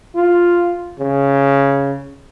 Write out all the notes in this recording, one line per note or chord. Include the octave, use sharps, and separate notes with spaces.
F4
C#3